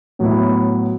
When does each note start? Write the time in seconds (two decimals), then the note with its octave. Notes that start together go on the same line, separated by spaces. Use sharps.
0.19 A2 F#3 B3 E4